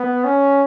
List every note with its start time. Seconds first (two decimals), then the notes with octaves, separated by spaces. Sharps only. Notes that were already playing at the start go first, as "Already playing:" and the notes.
Already playing: B3
0.24 C#4